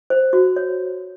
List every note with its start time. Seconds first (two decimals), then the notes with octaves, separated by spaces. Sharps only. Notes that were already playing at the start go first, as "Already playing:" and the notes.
0.10 C5
0.33 F#4
0.56 C#5